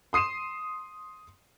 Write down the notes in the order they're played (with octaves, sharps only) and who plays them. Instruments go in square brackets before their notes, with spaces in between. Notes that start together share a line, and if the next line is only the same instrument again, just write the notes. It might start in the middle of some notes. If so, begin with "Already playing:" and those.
[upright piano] C6 D#6 C7 D#7 E7